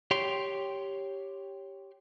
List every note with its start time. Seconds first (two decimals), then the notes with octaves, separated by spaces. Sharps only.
0.11 G4 C#5 G5 C6